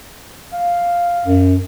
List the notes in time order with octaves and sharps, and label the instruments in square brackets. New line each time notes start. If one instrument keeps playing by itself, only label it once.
[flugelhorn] F5
[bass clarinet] F#2